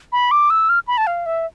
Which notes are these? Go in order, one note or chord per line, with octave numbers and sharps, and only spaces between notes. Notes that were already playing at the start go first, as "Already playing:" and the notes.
B5
D6
E6
F6
B5
A5
F5
E5